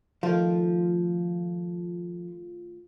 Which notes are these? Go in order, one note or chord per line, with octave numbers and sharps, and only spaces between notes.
D#3 F3 A3 F4